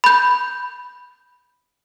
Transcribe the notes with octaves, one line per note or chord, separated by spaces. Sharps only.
B5 G6